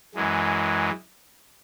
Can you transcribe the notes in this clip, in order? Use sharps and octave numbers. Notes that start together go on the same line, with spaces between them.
F#2 E3 G#3